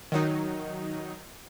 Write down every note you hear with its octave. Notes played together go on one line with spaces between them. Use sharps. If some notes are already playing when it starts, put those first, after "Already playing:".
D#3 F#3 D#4